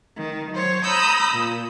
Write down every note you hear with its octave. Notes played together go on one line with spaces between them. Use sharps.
D#3
F#3 C5 C#5
A#5 B5 D#6 E6 G6
A#2